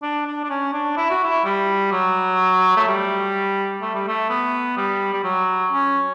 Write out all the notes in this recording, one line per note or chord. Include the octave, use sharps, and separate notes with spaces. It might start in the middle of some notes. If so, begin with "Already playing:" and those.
D4
D4
D4
C#4
D4
E4
F#4
E4
G3
F#3
A3
G3
A3
G3
A3
B3
G3
G3
F#3
C#4